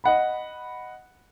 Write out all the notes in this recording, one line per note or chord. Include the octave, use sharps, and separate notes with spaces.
D#5 F#5 B5